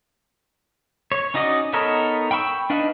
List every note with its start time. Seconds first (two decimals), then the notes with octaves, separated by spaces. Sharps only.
1.12 C#5
1.34 C#4 D#4 F#4 D5 D#5
1.73 B3 D#4 A4 A#4 C#5
2.31 G5 B5 C#6 E6
2.70 D4 D#4 B4 F5